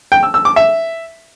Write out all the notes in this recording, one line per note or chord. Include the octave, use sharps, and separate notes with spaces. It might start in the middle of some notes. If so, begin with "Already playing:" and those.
G5
E6
E6
D6
E5